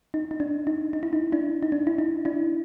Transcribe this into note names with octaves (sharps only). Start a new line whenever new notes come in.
D#4
D#4
D4
D#4
D#4
E4
D#4
D4 E4
D#4
D4
E4
D#4
D4 E4